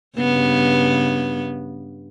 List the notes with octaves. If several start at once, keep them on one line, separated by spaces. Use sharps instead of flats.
G2 C#3 B3